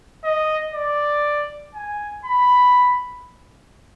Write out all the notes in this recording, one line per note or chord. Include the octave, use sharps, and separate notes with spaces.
D#5
D5
G#5
B5